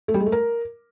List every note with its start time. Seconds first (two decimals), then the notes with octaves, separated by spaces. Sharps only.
0.08 A3
0.14 G3
0.20 G#3
0.26 A3
0.32 A#4